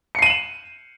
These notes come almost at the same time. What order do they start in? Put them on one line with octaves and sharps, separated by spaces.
C#7 C7 D#7 F#7 E7